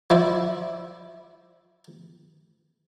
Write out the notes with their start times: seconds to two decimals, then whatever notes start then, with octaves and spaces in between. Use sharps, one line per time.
0.10 F3 E4 D5